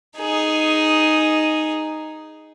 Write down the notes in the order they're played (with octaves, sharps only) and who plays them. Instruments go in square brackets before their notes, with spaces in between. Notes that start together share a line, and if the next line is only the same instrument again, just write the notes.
[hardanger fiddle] D#4 G#4